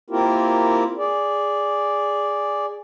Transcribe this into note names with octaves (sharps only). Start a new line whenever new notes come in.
A#3 C4 E4 F4 G4 A#4
G#4 D5